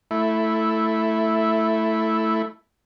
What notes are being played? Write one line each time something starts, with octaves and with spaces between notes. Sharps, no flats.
A3 E4